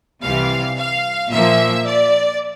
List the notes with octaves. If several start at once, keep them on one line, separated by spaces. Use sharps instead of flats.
C2 C3 E3 G3 F5
F5
A#2 F3 A#3 E5
D5